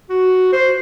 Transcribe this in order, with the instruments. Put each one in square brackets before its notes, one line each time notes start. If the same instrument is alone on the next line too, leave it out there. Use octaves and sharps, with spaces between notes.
[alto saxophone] F#4
C5